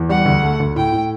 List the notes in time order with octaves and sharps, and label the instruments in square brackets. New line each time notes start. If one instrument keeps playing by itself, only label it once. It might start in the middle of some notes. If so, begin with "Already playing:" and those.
Already playing: [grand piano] E2
[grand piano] G3 [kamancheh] F#5
[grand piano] D2
A3
D2
[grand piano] A2 [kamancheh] G5
[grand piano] A2